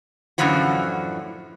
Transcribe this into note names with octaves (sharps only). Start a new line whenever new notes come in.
F#2 A2 D3 E3 F3 F#4